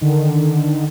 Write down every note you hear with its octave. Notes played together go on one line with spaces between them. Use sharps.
D3 D#3